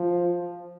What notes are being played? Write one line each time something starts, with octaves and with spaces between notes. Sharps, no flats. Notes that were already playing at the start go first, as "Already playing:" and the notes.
Already playing: F3